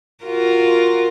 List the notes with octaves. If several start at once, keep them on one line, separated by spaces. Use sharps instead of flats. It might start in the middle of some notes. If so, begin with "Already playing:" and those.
F4 F#4 A#4